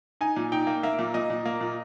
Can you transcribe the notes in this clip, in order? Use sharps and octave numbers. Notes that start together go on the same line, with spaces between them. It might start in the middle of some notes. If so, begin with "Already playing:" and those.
D#4 G#5
A#2
D#4 G5
A#3
A#3 E5
A#2
A#2 D#5
A#2
A#3
A#2